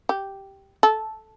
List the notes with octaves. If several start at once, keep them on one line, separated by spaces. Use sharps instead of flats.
G4
A4